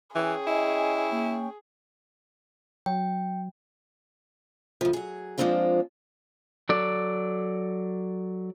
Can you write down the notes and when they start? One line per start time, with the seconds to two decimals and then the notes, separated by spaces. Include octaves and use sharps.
0.15 E3 C#4 G#4 G5 C#6
0.47 E4 D#5
1.11 A#3
2.86 F#3 G5
4.81 D2 F3
4.93 F#3 G#4
5.38 F3 G#3 A#3 C4 D4 F4
6.69 F#3 A4 D5